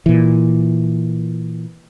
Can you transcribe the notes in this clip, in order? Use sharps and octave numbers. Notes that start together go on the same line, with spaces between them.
A#2 E3